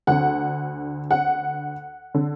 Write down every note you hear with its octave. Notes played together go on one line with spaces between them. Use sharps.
D2 D3 F#5
F#5
D3